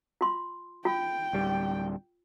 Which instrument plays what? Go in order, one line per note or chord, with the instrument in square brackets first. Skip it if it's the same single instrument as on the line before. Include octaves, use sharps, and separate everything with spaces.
[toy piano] F4 C6
[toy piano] F4 [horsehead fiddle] G5
[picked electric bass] D1 G3